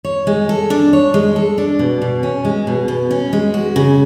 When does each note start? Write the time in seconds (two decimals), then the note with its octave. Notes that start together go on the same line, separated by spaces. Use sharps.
0.05 C#5
0.27 G#3
0.49 A4
0.70 D4
0.93 C#5
1.14 G#3
1.36 A4
1.58 D4
1.79 B2
2.02 B2
2.23 C#4
2.45 G#3
2.67 B2
2.88 B2
3.11 C#4
3.33 G#3
3.54 F#4
3.76 C#3